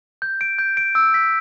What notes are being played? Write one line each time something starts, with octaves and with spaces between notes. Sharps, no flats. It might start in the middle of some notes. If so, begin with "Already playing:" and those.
G6
D7
G6
D7
E6
B6